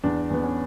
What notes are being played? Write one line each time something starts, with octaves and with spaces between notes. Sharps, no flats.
E2 D4
E2 B3
C#4